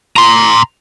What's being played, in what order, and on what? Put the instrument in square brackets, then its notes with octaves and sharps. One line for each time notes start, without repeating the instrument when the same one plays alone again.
[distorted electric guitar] A#5 C6